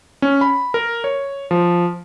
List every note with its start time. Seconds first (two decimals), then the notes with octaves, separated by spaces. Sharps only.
0.22 C#4
0.41 B5
0.74 A#4
1.04 C#5
1.51 F3